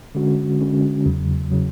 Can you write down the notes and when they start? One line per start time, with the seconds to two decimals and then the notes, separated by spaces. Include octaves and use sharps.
0.15 D3 G#3 C#4 F#4
0.61 D3 G#3 C#4 F#4
1.06 E2 C#3 F#3
1.52 C#3 F#3